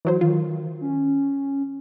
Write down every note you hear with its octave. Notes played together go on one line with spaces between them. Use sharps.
E3 F#3 C5
D#3 F4
C#4